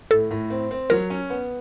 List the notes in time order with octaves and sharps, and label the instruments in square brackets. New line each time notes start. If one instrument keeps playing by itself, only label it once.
[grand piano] A2 [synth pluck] A4
[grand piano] A2
C4
C4
[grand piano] F#3 [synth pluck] A#4
[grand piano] C#4
B3